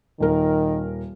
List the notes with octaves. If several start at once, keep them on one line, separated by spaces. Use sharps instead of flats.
D#1 D#3 A#4